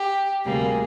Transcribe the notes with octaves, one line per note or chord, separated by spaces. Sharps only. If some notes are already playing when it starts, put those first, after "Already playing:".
Already playing: G4
D2 C3 G3 A#3 G#4